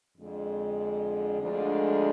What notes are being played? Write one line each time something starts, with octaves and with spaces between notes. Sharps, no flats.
F2 D3 G#3
D2 D3 F3 G#3 D4